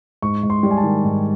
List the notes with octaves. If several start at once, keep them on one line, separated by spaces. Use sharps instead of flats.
G#2 C#6
G#2
C6
G3
G#5
A5
D#3
G#2